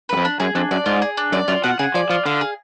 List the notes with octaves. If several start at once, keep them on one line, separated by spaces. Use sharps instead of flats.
F#2 B4
F2
D4
F#2 G#4
F2 D4
F#2 D5
G#2 F4
G#4
D4
F#2 D5
F#2 F4
B2 F#5
C#3 G#4
F3 D5
F3 F4
D3 F5
G#4